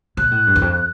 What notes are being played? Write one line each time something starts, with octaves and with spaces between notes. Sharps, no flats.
A#2 F#6
A2
G2
E2
F2